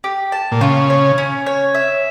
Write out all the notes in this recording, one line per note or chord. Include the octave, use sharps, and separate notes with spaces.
G4
A5
A#2
C#3 F4
C#5
C#4
C#5
E5